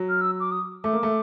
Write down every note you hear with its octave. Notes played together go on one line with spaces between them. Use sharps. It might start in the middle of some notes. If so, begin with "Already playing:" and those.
Already playing: F#3
F6
E6
D6
D#6
A3 D6
A#3
A3